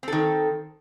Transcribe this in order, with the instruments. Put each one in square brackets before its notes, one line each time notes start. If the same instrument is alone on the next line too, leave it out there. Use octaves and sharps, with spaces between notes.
[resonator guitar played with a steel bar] C4
A4
D#3